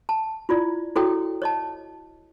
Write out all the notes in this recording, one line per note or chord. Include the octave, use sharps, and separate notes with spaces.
A5
E4 F4 D5
E4 F#4 A4 C#5 G5 D#6
C#5 D#5 A5